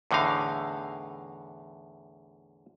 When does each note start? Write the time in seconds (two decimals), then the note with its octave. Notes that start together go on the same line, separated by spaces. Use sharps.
0.11 E2 A2 D3 D#4 F5